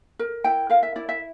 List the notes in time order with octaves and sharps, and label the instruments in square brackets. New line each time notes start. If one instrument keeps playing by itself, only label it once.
[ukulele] A#4
E4 G5
A#4 F5
E5
E4 D5
E5